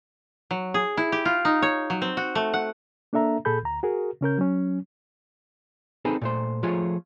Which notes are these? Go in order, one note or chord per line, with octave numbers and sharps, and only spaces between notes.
F#3
G#4
E4
G4
F4
D#4
C#5
F#3
C4
F#4
A3
F#5
A#3 D4 A4 E5 A#5
A#2 G#4 A4 B5 G6
D2 A#5
F#4 G#4 A#4
C#3 C#4 A#4 G6
F#3 C#4
C4 D#4 G#4 A4 B4
A#2 A3 C5
F3 A3 F4 G#4 C#5